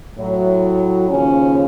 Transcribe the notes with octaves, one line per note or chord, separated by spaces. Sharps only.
A2 F#3
D#2 C#3 F3 C#4